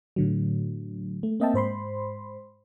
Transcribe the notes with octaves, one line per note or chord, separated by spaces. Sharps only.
A2 D3 F#3
A3
A#3 C4 D#5 E5 G5 A5
G#2 C5 B5 C6